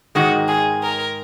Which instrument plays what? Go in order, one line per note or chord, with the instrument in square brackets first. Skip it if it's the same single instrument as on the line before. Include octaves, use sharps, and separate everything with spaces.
[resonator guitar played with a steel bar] G#2 D#3 G#3 [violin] F#4
[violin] G#4
A#4